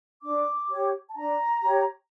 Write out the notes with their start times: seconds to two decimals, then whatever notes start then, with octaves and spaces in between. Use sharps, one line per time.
0.22 D4 D6
0.69 G4 C#5
1.10 A5
1.16 D4 A#5
1.63 G4 C#5